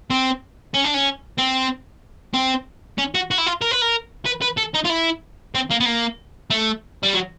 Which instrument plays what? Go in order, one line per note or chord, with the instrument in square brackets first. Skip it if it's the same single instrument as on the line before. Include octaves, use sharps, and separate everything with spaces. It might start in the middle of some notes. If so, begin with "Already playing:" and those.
[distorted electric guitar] C4
C#4
D4
C#4
C4
C4
C#4
F#4
F#4
E4
F4
A#4
B4
A#4
B4
B4
A4
D#4
F4
E4
C4
A#3
B3
A#3
A3
G3
F#3